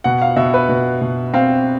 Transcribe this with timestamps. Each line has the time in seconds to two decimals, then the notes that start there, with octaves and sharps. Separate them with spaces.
0.04 B2 F#5
0.22 F5
0.36 B2 E5
0.54 B4
0.69 B2
1.01 B2
1.34 C4 F5